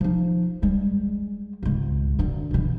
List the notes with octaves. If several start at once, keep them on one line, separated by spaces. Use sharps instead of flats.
F3 D#4
G3 G#3
G#1 C#2
F#2 D3
B2 E3